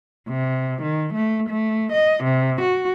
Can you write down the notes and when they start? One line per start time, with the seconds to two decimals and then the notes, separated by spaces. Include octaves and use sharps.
0.28 C3
0.82 D#3
1.13 A3
1.49 A3
1.92 D#5
2.24 C3
2.61 F#4